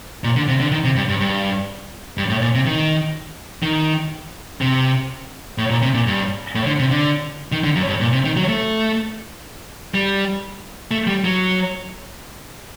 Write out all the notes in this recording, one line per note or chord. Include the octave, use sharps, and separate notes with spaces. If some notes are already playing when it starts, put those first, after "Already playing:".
A#2
D3
C3
D3
D#3
C3
G2
G2
G2
G2
A2
A#2
C3
D#3
D#3
C3
A2
A#2
C3
A#2
G2
A2
D3
C3
D3
D#3
D3
F#2
G2
A#2
C3
D#3
F#3
A3
G3
A3
G3
F#3